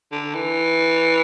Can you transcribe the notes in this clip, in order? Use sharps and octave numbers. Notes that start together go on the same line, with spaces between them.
D3
E3